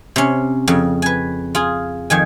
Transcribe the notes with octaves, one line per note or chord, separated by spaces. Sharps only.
C3 C#4
F2 C#3
B4 G#5
F4 G#4
F2 D#3 G#5